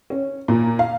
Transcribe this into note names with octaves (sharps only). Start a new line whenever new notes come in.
C#4
A#2
F5